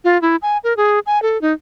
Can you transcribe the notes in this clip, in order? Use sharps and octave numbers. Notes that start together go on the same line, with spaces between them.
F4
E4
G#5
A#4
G#4
G#5
A4
D#4